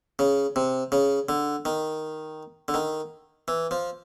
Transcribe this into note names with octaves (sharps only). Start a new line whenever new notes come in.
C#3
C3
C#3
D3
D#3
D3
D#3
E3
F3